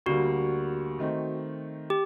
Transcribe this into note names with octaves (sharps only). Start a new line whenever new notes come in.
D2 D3 G3 A#3 F#4
D#3 A3 C4 D#4
G4